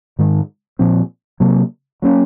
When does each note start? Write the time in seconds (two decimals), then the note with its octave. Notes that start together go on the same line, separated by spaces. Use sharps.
0.19 G#2 D#3 G#3
0.79 A#2 F3 C4
1.40 C3 F#3 A#3
2.02 F#3 A#3 C#4